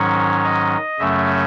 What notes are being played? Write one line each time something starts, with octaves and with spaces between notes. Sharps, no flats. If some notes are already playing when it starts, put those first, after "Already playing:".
Already playing: G#2 D#3 F#3 C#4 C#5
D#5
F#2 C#3 F#3 A3 C#4 E5